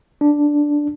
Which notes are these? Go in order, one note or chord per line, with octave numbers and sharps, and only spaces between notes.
D4